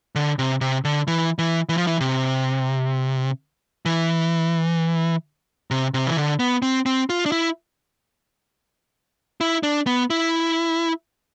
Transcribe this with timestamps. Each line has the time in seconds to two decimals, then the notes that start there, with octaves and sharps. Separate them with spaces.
0.15 D3
0.39 C3
0.61 C3
0.85 D3
1.07 E3
1.39 E3
1.69 E3
1.78 F3
1.87 E3
2.00 C3
3.86 E3
5.71 C3
5.94 C3
6.07 E3
6.17 D3
6.40 B3
6.62 C4
6.86 C4
7.10 F4
7.26 D4
7.32 E4
9.41 E4
9.63 D4
9.87 B3
10.10 E4